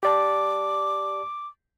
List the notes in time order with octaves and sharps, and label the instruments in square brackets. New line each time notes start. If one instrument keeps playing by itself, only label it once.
[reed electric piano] G4 D5 A5 [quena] D6